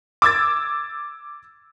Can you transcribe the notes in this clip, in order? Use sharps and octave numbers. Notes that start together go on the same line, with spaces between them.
D6 E6 G#6 A6